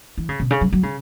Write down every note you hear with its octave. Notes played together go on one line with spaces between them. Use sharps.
E3
C#3
B2
C#3
F#3
F#3
C#3